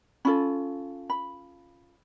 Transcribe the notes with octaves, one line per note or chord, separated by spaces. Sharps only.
C#4 F4 A4 B5
B5